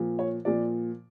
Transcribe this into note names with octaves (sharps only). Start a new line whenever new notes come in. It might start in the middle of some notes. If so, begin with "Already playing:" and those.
Already playing: A#2 F3
C#5
A#2 F3 D5